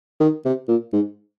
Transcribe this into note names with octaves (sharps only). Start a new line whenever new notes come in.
D#3
C3
A#2
G#2